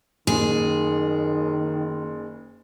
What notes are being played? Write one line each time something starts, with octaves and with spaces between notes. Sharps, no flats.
F#1 D#3 G#4